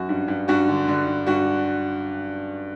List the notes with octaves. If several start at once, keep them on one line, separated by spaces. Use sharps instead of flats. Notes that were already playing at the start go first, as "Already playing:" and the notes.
Already playing: F#2 F#4
G2
G2
G2 F#4
D3
D3
D3
G2 F#4